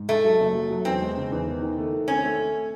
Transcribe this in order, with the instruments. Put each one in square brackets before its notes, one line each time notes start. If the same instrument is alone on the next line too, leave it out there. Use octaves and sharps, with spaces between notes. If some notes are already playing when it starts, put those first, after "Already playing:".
Already playing: [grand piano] G#2
[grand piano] G#3 [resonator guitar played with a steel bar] A3
[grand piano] F#3
F#1
F#3
F#3
[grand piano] E2 [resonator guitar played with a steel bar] C4
[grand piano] G#3
C#3
E2
D#3
D#3
A3
D#3
[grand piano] C4 [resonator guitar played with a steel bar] C#4
[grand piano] A3
A3